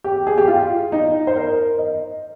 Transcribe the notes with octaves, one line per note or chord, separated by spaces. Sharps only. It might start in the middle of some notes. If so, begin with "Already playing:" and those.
G4
G#4
G4
F4
D#4
C5
A#4
D#5